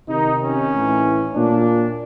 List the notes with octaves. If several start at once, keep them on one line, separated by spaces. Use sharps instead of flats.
C3 D#3 D#4
C#4
A2 E3
A#2 D4